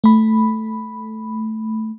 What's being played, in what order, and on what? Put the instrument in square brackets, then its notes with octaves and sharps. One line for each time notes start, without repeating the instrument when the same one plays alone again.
[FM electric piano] A3 B5